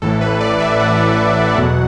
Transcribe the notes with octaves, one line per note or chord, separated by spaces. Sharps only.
A1 A2 E3 A4
B4
D5
E5
F#5
E2 B2 F#3